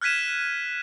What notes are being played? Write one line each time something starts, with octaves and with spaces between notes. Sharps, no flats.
F6 F#6 G#6 B6 D#7 E7